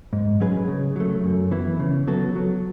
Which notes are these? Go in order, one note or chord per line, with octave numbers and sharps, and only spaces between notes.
G#2
F#3 C#4 G#4 B4
C#3
F#3 A3
F#2
E3 B3 E4
C#3
F#3 B3 F#4 A4
F#3